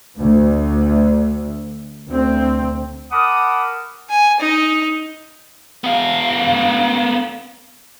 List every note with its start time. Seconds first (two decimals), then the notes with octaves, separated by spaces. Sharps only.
0.18 D2
2.08 D2 C4
3.11 A#4 F#5 A5 B5 D6 D#6
4.10 G#5
4.40 D#4
5.84 B3 F5